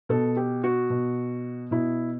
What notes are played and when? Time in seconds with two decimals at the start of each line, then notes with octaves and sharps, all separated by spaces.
0.09 B2 A4
0.37 G4
0.64 F#4
0.90 B2
1.71 B2 E4